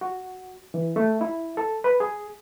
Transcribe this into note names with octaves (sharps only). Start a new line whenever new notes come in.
F#4
E3
A3
E4
A4
B4
G#4